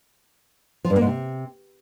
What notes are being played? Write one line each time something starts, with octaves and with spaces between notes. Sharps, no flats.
F3
G2
A#3
G#2
C3